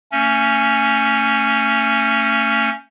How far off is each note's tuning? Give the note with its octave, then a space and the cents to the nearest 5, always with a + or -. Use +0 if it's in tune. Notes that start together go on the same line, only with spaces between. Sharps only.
A3 +40 C#4 +0